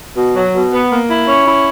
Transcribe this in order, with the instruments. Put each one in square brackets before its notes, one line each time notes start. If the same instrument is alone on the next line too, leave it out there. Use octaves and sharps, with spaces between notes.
[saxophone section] B2
F#3
B2
B3
A#3
E4
C#4
E4